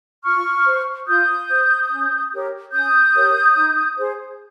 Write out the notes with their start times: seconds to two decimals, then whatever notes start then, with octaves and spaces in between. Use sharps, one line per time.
0.24 F4 C#6 F6
0.66 C5
1.08 F4 D#6 G6
1.49 C5
1.91 C#4
2.32 G4 A#4 C#5
2.72 C#4 D#6 G6
3.15 G4 A#4 C#5
3.55 D#4
3.97 G#4 C5